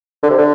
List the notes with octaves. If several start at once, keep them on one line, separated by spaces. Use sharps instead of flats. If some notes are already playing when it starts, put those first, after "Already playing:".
D3
C3
D3